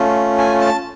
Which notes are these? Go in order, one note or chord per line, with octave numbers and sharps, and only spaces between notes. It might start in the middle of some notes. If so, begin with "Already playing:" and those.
Already playing: A3 C#4 F4
G#5
A5